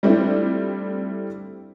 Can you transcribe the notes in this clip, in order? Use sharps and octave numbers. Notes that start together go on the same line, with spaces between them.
G3 A3 C4 D4 E4 F4